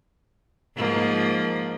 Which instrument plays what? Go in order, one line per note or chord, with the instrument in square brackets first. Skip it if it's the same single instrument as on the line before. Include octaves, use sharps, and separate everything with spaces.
[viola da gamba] G#2 F3 A#3